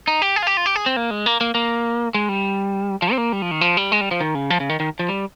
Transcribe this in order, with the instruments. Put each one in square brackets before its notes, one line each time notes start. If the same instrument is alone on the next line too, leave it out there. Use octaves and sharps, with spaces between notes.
[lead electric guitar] D#4
G4
G#4
F4
G4
F4
G4
G#4
C4
A#3
G#3
A#3
A#3
A#3
G#3
G3
F3
C4
A#3
G3
F3
D#3
F3
G3
G#3
G3
F3
D#3
C#3
F3
C#3
D#3
D#3
F3
G3